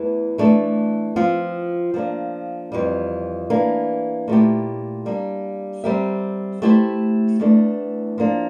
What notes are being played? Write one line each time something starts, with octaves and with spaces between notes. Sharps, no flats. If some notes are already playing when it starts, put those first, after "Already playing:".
Already playing: E2 E3 A3 E4
E3 A3 D4 A4
F3 C4 F4
F3 A#3 D4
F2 E3 G3
E3 A#3 D4
A#2 A3 E4 G4
G3 A#3 D4
G3 C4 G4 A#4 E5
A3 E4 G4 C5 E5
E2 E3 A3 D4
F3 A#3 D4